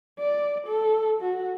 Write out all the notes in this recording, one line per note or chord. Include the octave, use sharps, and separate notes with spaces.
D5
A4
F#4